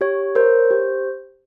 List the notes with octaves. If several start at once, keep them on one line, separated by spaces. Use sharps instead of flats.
G4 C#5
A#4 C5 C#5
G4